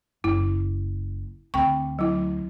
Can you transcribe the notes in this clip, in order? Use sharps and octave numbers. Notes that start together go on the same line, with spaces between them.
F#1 E4
D2 C4 G5 C#6
F#3 E4